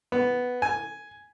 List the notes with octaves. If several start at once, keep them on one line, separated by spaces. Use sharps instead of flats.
B3
G#5